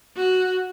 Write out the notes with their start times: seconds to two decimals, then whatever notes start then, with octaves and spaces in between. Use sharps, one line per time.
0.16 F#4